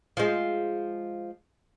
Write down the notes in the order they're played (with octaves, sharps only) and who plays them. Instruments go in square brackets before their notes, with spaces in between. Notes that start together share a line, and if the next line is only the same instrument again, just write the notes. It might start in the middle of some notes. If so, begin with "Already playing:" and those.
[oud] F3 G#3